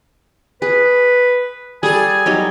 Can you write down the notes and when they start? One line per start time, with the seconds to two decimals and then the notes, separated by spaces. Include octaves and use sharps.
0.62 G#4 B4
1.83 G3 G#4 A4 G#5
2.26 F#3 G3 D#4